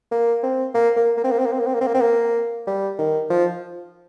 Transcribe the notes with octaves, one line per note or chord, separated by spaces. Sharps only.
A#3
C4
A#3
A#3
A#3
C4
A#3
C4
A#3
C4
A#3
C4
A#3
C4
A#3
C4
A#3
G3
D#3
F3